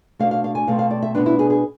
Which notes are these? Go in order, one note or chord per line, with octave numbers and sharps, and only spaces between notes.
B2 A3 D4 F5
F5
F5
G#5
B2 A3 C4 F5
F5
D5
E5
B2 B3 D4 B4
E4
G#4
G#4